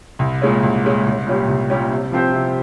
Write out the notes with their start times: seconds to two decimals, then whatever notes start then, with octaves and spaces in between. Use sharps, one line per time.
0.19 C2
0.42 A#2 G#3 C#4
0.63 C2
0.85 A#2 G#3 C#4
1.06 C2
1.27 A#2 G3 C#4 G4
1.48 C2
1.70 A#2 G3 C#4 G4
1.91 C3
2.12 F3 C4 G4 C5
2.33 C3